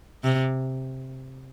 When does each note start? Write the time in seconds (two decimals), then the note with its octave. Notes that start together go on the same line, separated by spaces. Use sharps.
0.24 C3